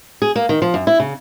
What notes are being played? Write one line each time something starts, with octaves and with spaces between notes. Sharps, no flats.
G#4
A#3
D#3
F3
F#2
E4
C#3